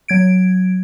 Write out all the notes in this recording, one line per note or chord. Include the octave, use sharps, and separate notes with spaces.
F#3 G#6 D7